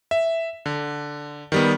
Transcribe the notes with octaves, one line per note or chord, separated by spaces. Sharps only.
E5
D3
D#3 G3 B3